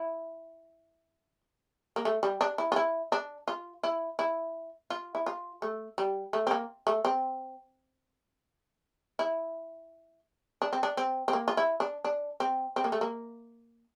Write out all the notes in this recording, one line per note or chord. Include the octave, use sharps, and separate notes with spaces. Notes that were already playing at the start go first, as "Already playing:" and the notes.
Already playing: E4
A#3
A3
G3
D4
E4
F4
E4
D4
F4
E4
E4
F4
E4
F4
A3
G3
A3
C4
A#3
A3
C4
E4
D4
C4
D4
C4
C4
A#3
F4
E4
D4
D4
C4
C4
A#3
A3
A#3